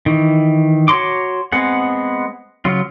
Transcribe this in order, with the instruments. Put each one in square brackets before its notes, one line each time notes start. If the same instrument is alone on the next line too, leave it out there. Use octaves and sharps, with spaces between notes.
[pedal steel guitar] D#3 E3
F#4 C#5 A#5 C6 D6
G#3 B3 C4 G#4 F#5
C#3 F#3 F4